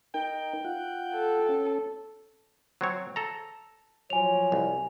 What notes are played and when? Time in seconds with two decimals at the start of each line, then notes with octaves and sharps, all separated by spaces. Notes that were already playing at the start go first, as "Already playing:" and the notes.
0.14 D#4 A#4 G5
0.65 F4 F#5
1.14 A4
1.49 C#4
2.81 F#3 C4 C#5
3.16 A4 A#5
4.10 F3 F#3 C#5 G#5 F7
4.52 C2